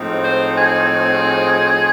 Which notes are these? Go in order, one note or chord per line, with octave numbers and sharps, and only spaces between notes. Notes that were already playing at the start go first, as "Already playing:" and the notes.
Already playing: A2 F3 G#3 C4 D#4
C5
G#4